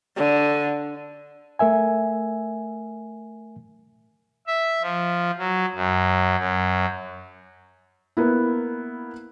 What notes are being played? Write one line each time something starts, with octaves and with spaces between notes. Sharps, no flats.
D3
A3 A#4 E5 G#5
E5
F3
F#3
F#2
F#2
A#3 B3 E4